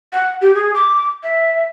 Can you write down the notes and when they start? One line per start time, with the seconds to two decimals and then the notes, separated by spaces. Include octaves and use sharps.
0.13 F#5
0.41 G4
0.55 G#4
0.74 D6
1.23 E5